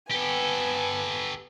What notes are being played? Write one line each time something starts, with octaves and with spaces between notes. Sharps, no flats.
B3 G4 A4 G#5